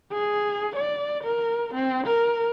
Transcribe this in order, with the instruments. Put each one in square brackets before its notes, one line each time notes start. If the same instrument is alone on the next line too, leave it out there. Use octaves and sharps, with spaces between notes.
[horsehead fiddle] G#4
D5
A#4
C4
A#4